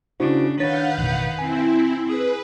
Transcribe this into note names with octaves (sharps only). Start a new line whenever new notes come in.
C#3 D4 E4 F#4 C5
D#3 D4 B4 C#5 F5 F#5 G6 A6
A1 F2 B2
C4 E4 G#5
G#4 B4